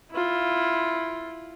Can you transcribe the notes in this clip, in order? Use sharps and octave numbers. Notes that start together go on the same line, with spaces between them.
E4 F4